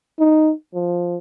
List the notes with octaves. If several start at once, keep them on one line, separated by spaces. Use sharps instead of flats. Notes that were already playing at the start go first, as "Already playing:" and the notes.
D#4
F3